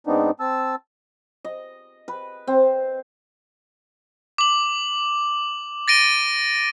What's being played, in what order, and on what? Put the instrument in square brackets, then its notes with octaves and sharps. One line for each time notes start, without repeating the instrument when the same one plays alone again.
[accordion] G#2 B3 C4 D4 D#4
C4 A5 E6
[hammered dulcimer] D#5
B4
C4
[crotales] D6 F#7
A6 A#6 D7 D#7 G7